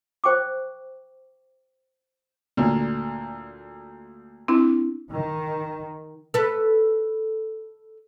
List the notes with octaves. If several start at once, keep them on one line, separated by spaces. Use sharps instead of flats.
C5 G5 C#6 D6
D2 A#2
C4 D4 E4
D#3
A4 B4